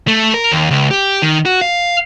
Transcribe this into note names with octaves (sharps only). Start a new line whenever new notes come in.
A3
A#4
D#2
C#2
G4
D#3
F#4
F5